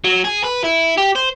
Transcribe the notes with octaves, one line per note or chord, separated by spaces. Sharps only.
F#3
G#4
B4
E4
G4
C5